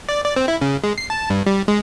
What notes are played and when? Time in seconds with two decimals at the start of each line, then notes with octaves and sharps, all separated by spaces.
0.09 D5
0.24 D5
0.36 C4
0.48 E4
0.61 C#3
0.84 G#3
0.98 C7
1.10 A5
1.30 G2
1.46 G3
1.68 G#3